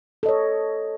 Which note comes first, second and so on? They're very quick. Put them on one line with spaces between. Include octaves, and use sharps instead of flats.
A4 D#5 C#5